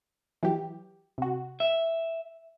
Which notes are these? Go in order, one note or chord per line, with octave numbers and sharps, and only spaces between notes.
E3 F#3 G4
C3 F#4
E5